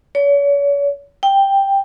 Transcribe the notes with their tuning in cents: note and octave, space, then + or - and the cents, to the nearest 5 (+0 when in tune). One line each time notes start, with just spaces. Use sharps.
C#5 +40
G5 +5